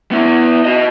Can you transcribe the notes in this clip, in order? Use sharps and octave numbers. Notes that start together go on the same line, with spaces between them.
B3 E4
F#4 D#5